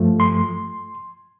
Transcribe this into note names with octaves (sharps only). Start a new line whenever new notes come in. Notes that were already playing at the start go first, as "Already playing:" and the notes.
Already playing: G2 F3 A3
C6